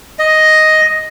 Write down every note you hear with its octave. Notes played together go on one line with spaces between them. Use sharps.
D#5